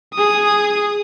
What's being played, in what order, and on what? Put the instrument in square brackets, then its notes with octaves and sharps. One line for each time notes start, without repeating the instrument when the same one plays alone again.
[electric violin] G#4 D#6